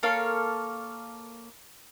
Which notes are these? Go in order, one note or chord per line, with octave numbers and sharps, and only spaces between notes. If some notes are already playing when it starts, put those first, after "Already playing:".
A#3 A4 C#5 F5